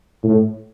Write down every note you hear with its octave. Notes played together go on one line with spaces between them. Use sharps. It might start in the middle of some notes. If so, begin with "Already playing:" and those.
A2